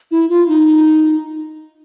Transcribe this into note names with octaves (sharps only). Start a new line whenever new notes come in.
E4
F4
D#4